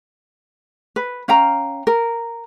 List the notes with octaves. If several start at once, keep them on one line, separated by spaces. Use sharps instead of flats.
B4
C#4 F5 G5 A#5
A#4